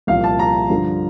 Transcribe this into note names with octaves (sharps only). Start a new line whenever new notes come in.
C2 A#2 F3 F5
A5
A#5
G2 D3 F3